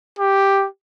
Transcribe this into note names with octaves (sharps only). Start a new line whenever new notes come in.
G4